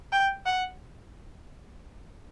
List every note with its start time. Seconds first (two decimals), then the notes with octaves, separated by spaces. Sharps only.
0.12 G5
0.46 F#5